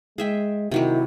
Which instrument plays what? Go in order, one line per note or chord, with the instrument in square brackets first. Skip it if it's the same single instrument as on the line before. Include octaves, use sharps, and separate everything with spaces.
[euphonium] G#3 [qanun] G#4 E5 G5
[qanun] C3 F#3 G3 [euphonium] D#3 [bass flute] E4